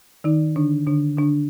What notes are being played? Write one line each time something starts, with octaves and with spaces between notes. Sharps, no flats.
D#3 D#4
D3 D4
D3 D4
D3 D4